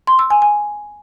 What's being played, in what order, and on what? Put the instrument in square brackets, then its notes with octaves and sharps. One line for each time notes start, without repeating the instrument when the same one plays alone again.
[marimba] C6
E6
G#5
G#5